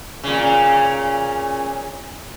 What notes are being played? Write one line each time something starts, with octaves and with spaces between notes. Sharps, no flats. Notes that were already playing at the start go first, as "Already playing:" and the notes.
A#2 C#3